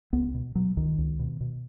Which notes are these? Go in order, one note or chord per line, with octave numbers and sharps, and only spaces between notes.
C#2 B3
B2
B2 F#3
C#2 D#3
C#2
B2
B2